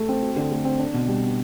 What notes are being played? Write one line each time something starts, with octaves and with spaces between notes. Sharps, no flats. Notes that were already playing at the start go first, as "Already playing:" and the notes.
Already playing: A3
C4
F#4
D3
A3
C4
D4
B2
G3
B3